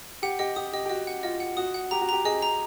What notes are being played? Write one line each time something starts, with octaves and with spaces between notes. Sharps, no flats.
G4 F#5
G4 D#5
G4 D#6
G4 D#5
G4
F#4 D#5
F#5
F4 D#5
F#5
F#4 D#6
F#5
G4 A#5
F#4
G4 A#5
G#4 D#5
A#5